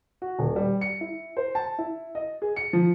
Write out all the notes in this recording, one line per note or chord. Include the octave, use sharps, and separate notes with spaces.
F#4
D#1
G3
C#7
E4
C5
A5
E4
D#5
G#4
C#7
F3